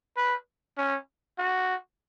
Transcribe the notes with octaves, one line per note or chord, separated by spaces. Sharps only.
B4
C#4
F#4